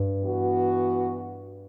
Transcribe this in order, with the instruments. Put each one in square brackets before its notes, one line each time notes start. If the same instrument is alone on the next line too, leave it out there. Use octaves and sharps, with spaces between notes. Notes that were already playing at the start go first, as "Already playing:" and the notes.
Already playing: [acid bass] G2
[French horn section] E3 B3 F#4